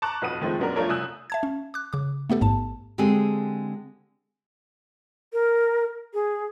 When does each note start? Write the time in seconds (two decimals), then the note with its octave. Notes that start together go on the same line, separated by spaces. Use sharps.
0.02 A5 A#5 C#6 D6 F#6
0.22 B1 F2 B4 F#5 D#6 D#7
0.42 D#3 F3 G#3 A3 C4
0.59 B1 F#2 B3 D4 F#4 A#4
0.76 F3 A3 D4 F4 A#4 C#5
0.89 C2 G#5 D#6 E6 F#6 G6
1.30 E5 A5 G#6
1.43 C#4
1.74 D6 F#6
1.93 C#3 D6
2.30 A3 B3 G4 A4
2.41 A1 G#2 A5
2.98 D3 G#3 C4 G4 G#4
5.33 A#4
6.14 G#4